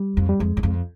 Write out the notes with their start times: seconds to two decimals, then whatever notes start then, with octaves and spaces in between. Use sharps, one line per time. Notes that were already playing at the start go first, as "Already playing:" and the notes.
Already playing: G3
0.17 F2
0.29 G3
0.40 F2 G#3
0.57 F#2
0.63 F2